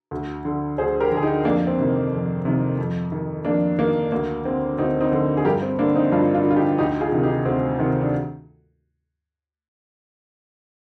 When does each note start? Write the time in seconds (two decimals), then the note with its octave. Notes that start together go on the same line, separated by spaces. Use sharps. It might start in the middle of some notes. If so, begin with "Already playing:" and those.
0.11 D2
0.45 D3
0.78 D2 G#4 C5
1.00 G4 A#4
1.11 D3
1.17 G#4
1.23 D#4 G4
1.45 F2 A#3 D4
1.67 C4
1.79 C3 D#3
2.12 F2
2.45 C3 D#3
2.78 F2
3.12 D#3
3.45 F2 A#3 D4
3.79 D#3 A#3
4.12 D2 A#3
4.45 D3 C4
4.78 D2 C4 D#4
5.01 C4 D#4
5.12 D3
5.37 G#4
5.45 G2 G4 A#4
5.62 C4
5.79 D3 A#3 D4
5.95 C4 D#4
6.12 G2 D4 F4
6.34 D4 F4
6.46 D3
6.51 F4
6.56 D#4 G4
6.78 D2 D#4 G4
7.01 F4 G#4
7.12 C3 D#3
7.23 D#4 G4
7.45 D2 C4
7.79 C3 D#3 C4
8.01 D4